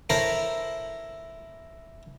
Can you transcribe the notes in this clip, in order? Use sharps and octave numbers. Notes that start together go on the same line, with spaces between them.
E4 A4 A#4 C5 C#5 B5